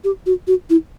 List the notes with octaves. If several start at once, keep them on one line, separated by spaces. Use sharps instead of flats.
G4
F#4
F#4
E4